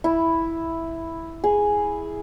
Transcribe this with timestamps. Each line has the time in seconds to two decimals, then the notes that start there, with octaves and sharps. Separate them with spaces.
0.04 E4
1.44 G#4